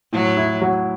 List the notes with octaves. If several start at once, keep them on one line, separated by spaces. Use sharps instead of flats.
A2 F#3
E4
F#3